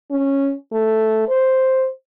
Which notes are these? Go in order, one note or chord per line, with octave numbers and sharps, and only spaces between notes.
C#4
A3
C5